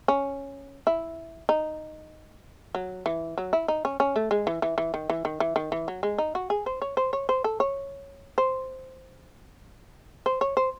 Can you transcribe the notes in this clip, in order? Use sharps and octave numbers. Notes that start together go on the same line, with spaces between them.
C#4
E4
D#4
F#3
E3
F#3
E4
D#4
C#4
C#4
A3
G#3
E3
E3
E3
D#3
E3
D#3
E3
D#3
E3
F#3
G#3
D#4
F#4
G#4
C5
C#5
C5
C#5
C5
A4
C#5
C5
C5
C#5
C5